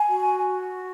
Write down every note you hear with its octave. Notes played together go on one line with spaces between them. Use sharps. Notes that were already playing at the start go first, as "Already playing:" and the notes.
Already playing: G#5
F#4